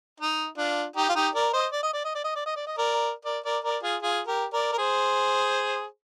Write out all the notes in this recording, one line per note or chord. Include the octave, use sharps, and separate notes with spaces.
D#4
D4 F4
D#4 G4
F4
D#4 G4
A#4 D5
C5 D#5
D5
D#5
D5
D#5
D5
D#5
D5
D#5
D5
D#5
A#4 D5
A#4 D5
A#4 D5
A#4 D5
F4 G#4
F4 G#4
G4 A#4
A#4 D5
A#4
G#4 C5